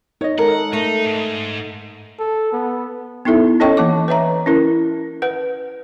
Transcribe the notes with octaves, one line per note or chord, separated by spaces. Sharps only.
D#4 C#5 D#5
G#3 A4 A#4 F#5
A3 D#4
G#2
A4
B3
B3 D#4 E4 A4 E5
C#4 A4 C#5 D#5 G5 C#6
E3 A#3 A5 D6
B4 C#5 E5 A#5
C#4 E4 A#4
B4 F#5